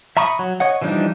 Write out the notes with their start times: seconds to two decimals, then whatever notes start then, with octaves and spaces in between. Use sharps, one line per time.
0.17 E5 A#5 B5 C#6 D#6
0.39 F#3
0.60 C#5 D#5 F#5
0.82 E3 F3 G3 D4 D#4